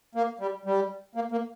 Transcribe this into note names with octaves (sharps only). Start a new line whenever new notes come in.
A#3
G3
G3
A#3
A#3